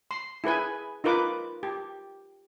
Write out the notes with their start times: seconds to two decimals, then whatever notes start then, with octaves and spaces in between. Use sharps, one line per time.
0.11 C6
0.44 E4 G#4 B4 G#5
1.04 D#4 F4 A#4 B4 D6
1.63 G4